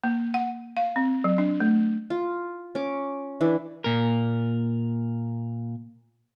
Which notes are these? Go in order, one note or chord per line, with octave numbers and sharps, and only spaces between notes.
A#3
F#5
F5
C4
F#3
D4
A3
F4
C#4 D6
E3 D4 E4
A#2 A#4